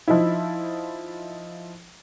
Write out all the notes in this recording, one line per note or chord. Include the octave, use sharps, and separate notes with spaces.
F3 D#4 E4